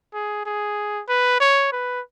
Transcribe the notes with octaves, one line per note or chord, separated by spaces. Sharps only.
G#4
G#4
B4
C#5
B4